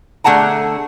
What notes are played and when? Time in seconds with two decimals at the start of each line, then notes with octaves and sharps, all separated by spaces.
0.24 D3 A3 G#4 F#5 A5 A#5